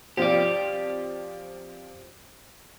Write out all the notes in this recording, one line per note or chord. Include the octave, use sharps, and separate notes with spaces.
F3 C4 F4 G4 D5